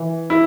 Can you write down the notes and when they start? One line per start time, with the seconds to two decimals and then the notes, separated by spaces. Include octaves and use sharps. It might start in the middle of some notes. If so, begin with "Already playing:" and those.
Already playing: E3
0.30 E4